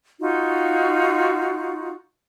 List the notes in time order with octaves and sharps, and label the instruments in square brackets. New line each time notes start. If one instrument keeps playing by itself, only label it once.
[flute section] D#4 F4 F#4